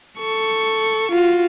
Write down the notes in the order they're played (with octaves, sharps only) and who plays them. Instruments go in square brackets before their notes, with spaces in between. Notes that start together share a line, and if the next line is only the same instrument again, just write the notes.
[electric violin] A4 C#6
F4 F#4